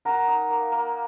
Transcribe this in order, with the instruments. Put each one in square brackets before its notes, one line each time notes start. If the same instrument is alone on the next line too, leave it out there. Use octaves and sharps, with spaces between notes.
[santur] A#4 [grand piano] F#5 A#5
[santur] D#4
A#3
A#3